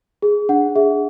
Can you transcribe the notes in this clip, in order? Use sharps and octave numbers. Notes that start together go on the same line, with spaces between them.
G#4
D4 F#5
G#4 E5